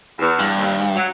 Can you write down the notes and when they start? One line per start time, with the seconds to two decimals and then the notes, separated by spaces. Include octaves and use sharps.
0.19 E2
0.39 G2
0.56 D#2
0.95 F#3